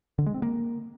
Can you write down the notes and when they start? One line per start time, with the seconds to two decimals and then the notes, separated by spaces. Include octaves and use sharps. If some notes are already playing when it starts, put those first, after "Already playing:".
0.18 D3
0.26 G#3
0.34 C4
0.42 A#3